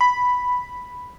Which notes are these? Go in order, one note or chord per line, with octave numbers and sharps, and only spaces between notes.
B5